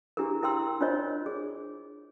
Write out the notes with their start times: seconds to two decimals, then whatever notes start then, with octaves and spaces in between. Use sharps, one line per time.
0.17 D4 E4 G4 G#4 A#4
0.43 E4 A#4 G5 C6 E6
0.81 D4 F4 A#4 C5 C#5 D#5
1.26 G#4